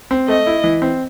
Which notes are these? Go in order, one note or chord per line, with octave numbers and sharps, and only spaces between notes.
C4
A3 D#5
E4
E3
C4